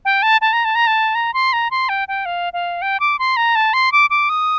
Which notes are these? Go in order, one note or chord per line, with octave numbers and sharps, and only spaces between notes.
G5
A5
A5
A#5
A5
A#5
A5
A#5
C6
A#5
C6
G5
G5
F5
F5
G5
D6
C6
A#5
A5
C6
D6
D6
D#6